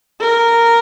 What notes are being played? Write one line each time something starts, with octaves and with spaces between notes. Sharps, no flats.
A#4